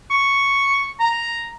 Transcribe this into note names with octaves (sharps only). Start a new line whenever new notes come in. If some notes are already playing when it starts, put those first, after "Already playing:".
C#6
A#5